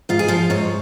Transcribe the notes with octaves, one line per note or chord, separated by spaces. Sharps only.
G#2 F4
G#4
F3 F4
G#2 C#5